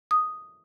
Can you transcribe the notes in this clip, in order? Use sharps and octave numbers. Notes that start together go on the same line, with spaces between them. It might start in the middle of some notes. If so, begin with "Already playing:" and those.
D#6